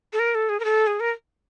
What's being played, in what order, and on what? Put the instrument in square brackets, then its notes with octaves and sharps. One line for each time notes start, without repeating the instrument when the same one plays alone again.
[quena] A4
A#4
A4
G#4
A#4
A4
G#4
A#4